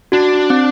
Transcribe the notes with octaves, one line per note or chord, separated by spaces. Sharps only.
D4 F#4
C4